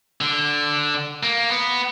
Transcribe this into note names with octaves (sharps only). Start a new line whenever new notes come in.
D3
A#3
B3